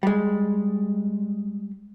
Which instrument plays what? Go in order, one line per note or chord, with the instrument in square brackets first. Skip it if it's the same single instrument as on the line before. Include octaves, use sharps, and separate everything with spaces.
[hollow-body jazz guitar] G3 G#3